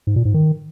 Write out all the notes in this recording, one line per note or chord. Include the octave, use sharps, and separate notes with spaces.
G#2
A#2
G#2
D#3